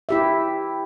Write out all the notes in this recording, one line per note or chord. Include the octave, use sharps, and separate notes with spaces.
E4 G4 E5